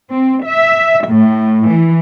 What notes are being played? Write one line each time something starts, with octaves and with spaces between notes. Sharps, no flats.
C4
E5
A2
E3